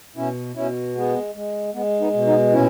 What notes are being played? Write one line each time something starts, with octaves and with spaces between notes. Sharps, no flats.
B2 C#4 E4
B2 C#4 E4
G#3 B3
G#3
G#3 B3
B3 D#4
B2
B3 D#4
A#2 C#4 E4